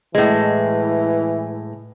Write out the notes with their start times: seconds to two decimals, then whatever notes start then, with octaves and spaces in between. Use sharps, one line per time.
0.15 A2 E3 G#3